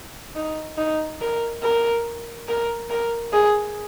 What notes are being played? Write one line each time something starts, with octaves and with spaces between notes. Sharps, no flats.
D#4
D#4
A#4
A#4
A#4
A#4
G#4